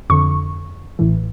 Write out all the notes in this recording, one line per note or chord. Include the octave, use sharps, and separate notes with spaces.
F2 D3 C#6
A1 A2 E3